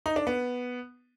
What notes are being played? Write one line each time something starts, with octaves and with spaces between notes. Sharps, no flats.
D#4
D4
B3